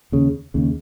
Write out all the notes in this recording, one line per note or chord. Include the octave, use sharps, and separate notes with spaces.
D#2 C#3
D#2 C#3